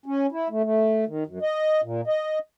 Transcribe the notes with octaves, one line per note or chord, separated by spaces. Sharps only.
C#4
E4
A3
A3
D#3
F#2
D#5
A#2
D#5